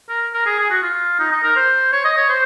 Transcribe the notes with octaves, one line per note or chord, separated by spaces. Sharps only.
A#4
A#4
G#4
G#4
F#4
F4
D#4
D#4
A#4
C5
C#5
D#5
C#5
C5